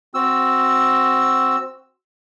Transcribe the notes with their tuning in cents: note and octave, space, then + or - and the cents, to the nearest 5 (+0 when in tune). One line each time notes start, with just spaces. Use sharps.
C4 +0 F#4 +0 E6 +0